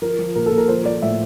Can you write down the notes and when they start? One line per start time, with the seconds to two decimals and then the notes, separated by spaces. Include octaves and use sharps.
0.02 F3 A#4
0.19 F3
0.36 A#2 A#4
0.46 A4
0.52 A#2
0.58 A#4
0.68 F3 C5
0.85 F3 D5
1.02 A2 E5